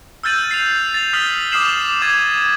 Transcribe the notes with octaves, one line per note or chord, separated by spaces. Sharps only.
E6 F6 G6 A6 D#7 F#7
C7 F7
A6 F7
D#6 F6 B6 C7 F#7 G7
D6 D#6 F6 C7 E7 F#7
D6 G#6 A6 D#7